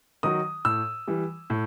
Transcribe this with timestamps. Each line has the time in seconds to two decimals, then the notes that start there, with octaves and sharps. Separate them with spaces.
0.23 D#3 F#3 D#6
0.65 A2 E6
1.07 E3 G3
1.50 A2